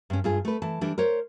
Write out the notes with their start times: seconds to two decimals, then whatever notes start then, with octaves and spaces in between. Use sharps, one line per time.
0.10 G2 C#4
0.24 G2 F4 G#4
0.45 A3 B4
0.62 E3 A5
0.81 E3 G3 D4
0.98 A#4 C5 C#5